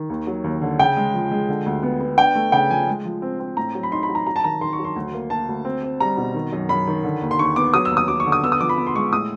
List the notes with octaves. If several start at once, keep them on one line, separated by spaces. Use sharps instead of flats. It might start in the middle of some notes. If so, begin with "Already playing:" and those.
Already playing: D#3
D#2
F#3
D#2
D3
C#3 G5
G#3
F3
G#3
D3
D2
B3
B3
D4 G5
A3
C#3 G5
F3 G#5
G#3
F3
C4
C4
A2 A#5
F#3
B5
D#4 C6
B5
F#3
A#5
F#3 A#5
A5
D#3 A#5
D#3 C6
C#6
F#3
C6
D2
A#3
A#3 A5
D2
C4
C4
G3 A#5
B2
D#3
F#2
F#2 B5
D#3
D3
D#2
C6
D#2 C#6
B3 D6
F#3 D#6
E6
D#2
D#6
F#3 D6
C#6
D3
D#6
B3 E6
D#6
F3 D6
B5
B3
C6
G#3 C#6
A2 D#6